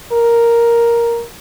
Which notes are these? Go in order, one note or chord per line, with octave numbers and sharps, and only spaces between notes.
A#4